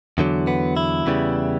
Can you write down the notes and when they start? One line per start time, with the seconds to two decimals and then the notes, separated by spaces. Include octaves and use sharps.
0.18 E2 D3 F#3
0.47 B3
0.77 E4
1.06 E2 C#3 E3 G3